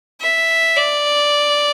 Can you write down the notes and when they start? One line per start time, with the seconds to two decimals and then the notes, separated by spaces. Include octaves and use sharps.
0.21 E5
0.76 D5